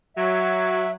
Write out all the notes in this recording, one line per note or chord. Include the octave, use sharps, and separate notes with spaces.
F#3 E5